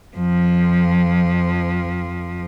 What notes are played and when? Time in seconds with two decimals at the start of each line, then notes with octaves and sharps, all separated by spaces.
0.17 F2 F3